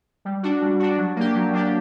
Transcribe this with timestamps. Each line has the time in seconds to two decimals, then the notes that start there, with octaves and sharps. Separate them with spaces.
0.25 G3
0.43 D4 F#4
0.62 G3
0.80 D4 F#4
0.98 F#3
1.16 A#3 D4 G4
1.35 F#3
1.53 A#3 D4 G4